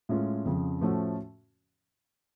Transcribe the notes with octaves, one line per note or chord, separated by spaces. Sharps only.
A2 G#3 C#4 F4
F2 C#3 F3
A2 F3 A3 C#4 F#4